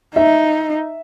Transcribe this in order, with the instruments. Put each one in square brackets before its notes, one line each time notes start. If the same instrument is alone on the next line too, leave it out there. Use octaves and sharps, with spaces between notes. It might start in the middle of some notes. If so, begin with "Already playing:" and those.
[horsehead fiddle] D#4 [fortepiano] E5